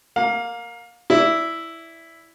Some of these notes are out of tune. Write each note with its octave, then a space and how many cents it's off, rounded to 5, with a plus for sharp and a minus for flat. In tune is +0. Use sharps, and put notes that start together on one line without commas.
A#3 +0 F5 +30
E4 +0 D5 -15